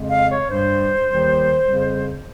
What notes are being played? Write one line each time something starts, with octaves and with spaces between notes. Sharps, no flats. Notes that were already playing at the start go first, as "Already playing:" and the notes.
Already playing: F2 C#3 G#3
F5
C#5
G2 G3 C5
D#2 D#3 G3
F2 C#3 G3